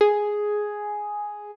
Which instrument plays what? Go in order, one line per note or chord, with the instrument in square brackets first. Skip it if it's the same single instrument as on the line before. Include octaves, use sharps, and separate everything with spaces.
[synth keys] G#4